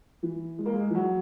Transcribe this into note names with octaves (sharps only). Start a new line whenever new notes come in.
E3
G#3
A#3
G#3
E3
F#3